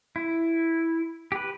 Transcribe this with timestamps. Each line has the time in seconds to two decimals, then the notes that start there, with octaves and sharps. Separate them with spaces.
0.16 E4
1.32 G4 B4